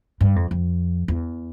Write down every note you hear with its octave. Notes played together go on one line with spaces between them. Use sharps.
G2
F2
F2
E2